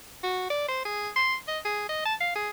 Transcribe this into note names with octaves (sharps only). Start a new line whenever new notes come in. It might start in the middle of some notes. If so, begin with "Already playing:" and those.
F#4
D5
C5
G#4
C6
D#5
G#4
D#5
A5
F5
G#4